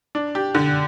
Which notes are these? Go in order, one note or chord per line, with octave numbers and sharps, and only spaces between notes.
D4
G4
D3